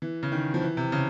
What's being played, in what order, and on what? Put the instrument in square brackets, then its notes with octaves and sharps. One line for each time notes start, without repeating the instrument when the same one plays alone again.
[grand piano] E3
C#3
D#3
F3
E3
C3
C#3